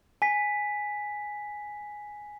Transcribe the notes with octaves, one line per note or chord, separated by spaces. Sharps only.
G#5 B6